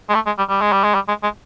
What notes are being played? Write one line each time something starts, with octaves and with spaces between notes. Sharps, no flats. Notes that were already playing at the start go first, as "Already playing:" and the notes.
G#3
A3
G#3
G3
G3
G#3
G3
G#3
G3
G#3
G#3